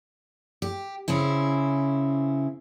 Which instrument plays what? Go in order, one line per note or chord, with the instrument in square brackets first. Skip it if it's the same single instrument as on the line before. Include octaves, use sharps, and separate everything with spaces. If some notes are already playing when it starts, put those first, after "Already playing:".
[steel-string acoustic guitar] G4
C#3 C4 C#4 E4